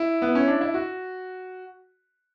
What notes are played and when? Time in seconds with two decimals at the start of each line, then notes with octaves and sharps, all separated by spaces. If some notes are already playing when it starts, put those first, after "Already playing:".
Already playing: E4
0.22 B3
0.35 C#4
0.47 D4
0.61 E4
0.74 F#4